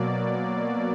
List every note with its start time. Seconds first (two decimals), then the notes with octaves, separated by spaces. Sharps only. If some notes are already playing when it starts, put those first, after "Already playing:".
Already playing: B2 F#3 A#3 D5